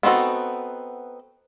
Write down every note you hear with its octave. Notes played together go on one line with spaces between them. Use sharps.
B3 C4 D#4 F#4 A4